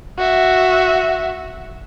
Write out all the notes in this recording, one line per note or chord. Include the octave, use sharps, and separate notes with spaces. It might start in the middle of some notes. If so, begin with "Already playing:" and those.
F#4 E5